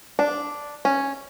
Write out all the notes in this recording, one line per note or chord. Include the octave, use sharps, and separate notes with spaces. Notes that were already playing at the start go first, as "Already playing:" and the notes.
D4
C#4